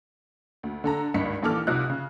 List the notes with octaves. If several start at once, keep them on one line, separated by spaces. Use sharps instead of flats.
D2
D3 A4 A#5
G#1 C#2 G2 B6 C#7
A#1 D#2 E3 A4 D6 F6
C2 C3 F3 D#4 F#6
C#3